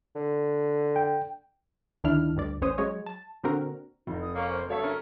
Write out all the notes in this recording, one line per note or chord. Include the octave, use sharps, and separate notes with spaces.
D3
G5
D2 D#3 D4 E4 F6
D2 G2 D5
A1 C#4 C5 D#6
F#3 G#3 C#5
A5
A#2 D3 C4 F#4 A#4
F1 D#4
D#6
A#3 C#4 F5
C5
G2 C#3 F#3 A3 A4 C#5 E5
C#4 A#4